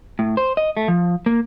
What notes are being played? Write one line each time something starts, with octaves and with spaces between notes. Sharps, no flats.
A2
C5
D#5
A3
F3
A#3